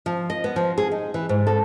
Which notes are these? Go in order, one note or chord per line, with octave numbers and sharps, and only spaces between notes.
F3
D#5
B3
F3
G#4
D#4
E3
G#2
A4